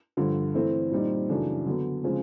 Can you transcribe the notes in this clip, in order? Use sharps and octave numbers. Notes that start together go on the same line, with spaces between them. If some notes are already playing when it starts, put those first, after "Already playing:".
G2 D3 F3
E3 A3 C4 E4
A#2 G3 C4 D#4
F#2 C#3 E3 A3 D4
D3 F#3 B3
C#3 F3 G#3 C4